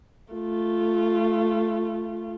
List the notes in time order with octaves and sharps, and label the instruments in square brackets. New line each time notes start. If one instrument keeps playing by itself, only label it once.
[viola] A3 F4